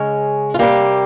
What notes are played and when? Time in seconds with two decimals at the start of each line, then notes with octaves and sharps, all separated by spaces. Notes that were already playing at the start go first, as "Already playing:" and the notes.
Already playing: C#3 G#3 C#4
0.54 F4
0.59 C3 G3 A#3 G4